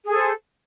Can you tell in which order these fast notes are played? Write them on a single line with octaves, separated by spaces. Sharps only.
G#4 A4 C5